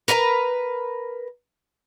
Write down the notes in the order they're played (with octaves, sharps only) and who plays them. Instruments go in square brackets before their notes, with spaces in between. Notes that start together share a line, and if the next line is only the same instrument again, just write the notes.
[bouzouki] A#4 B4 G5 A#5